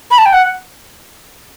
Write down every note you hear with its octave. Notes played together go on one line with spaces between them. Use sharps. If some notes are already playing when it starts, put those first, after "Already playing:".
B5
A5
G5
F#5